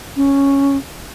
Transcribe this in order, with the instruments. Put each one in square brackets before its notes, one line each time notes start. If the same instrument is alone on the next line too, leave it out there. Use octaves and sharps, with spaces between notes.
[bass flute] C#4